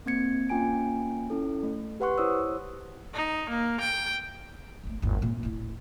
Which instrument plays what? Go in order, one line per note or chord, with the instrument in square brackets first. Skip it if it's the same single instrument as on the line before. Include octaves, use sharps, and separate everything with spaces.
[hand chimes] A#3 C4 G#6 C#7
A#3 C#4 F4 G5 G#5 D7
C#4 E4 A4
A3
G4 B4 F#5 C6 C#6 F#6
E4 C5 C#5 D#6 E6
[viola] D#4
A#3
G5
[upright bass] G1 A3
G1 E2
A#2 C4
D1 E4